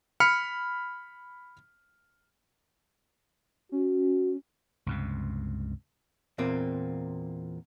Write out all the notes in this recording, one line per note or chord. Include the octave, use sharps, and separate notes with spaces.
B5 F6 C#7
C#4 F#4
C#2 G2 C3
E2 A#2 A#3 C4